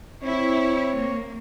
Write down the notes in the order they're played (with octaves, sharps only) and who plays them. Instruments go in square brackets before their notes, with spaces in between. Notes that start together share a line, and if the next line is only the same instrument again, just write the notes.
[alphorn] C4 [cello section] E4 [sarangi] C#5
[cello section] A#3